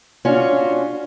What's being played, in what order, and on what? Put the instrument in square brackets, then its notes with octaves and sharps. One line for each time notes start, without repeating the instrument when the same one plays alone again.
[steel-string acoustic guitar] C#4 D4 F4 F#4